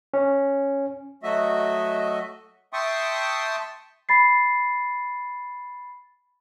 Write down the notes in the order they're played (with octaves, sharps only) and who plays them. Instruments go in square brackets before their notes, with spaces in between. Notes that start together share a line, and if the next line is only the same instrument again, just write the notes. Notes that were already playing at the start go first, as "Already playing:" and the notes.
[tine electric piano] C#4
[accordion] F#3 A3 F#4 D#5 E5
E5 G5 A5 C6 C#6 D#6
[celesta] B5 A6 C7